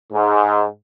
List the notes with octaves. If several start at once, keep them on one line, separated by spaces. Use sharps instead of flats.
G#2